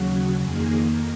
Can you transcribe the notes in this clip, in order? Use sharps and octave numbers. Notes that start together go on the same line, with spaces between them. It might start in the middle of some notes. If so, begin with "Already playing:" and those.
Already playing: D#2 C#3 F#3 F#4
F2 D#3 A#3 G#4